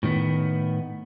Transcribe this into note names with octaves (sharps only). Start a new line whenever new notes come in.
A2 D#3 B3